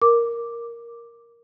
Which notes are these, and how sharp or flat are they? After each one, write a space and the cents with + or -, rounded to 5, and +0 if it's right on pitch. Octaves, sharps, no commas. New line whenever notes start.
A#4 +0 D6 +0